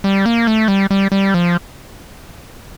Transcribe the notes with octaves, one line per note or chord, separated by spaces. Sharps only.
G3
A#3
A3
G3
G3
G3
F3